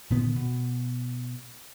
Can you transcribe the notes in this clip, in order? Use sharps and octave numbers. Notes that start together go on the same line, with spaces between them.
A#2 D3 D#3 B3
B2